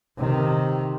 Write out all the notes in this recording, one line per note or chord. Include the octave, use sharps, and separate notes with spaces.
C3 D#3